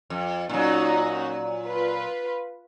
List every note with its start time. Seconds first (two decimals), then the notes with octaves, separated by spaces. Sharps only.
0.10 F2
0.49 A#2 F#3 C#4 D#4 F#4
1.66 F4 B4